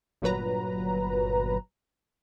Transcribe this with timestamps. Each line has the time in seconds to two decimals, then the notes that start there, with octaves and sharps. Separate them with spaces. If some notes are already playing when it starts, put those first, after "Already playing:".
0.22 G1 A#2 F#3 B4 A#5